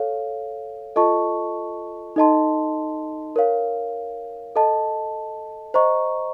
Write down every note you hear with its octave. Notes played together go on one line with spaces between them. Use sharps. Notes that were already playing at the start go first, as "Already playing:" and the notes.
Already playing: A4 C#5 F5
F4 A4 D#5 A5 C#6
D#4 A4 D#5 A5 C6
A#4 C#5 F5
A4 D#5 A5
C5 D#5 A#5 C#6